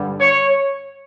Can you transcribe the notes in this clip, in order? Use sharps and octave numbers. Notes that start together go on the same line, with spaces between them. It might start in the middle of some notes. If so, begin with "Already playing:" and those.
Already playing: G2 D3 G3
C#5